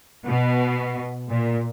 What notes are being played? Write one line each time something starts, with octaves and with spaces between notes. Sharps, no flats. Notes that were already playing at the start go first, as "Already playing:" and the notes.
B2
A#2